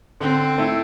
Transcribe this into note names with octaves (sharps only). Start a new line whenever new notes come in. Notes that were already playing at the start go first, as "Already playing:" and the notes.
D3 C4
A3 E4